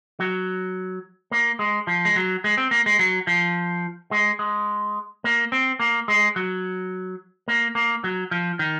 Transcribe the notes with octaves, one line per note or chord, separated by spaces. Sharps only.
F#3
A#3
G#3
F3
G#3
F#3
G#3
C4
A#3
G#3
F#3
F3
G#3
G#3
A#3
C4
A#3
G#3
F#3
A#3
A#3
F#3
F3
D#3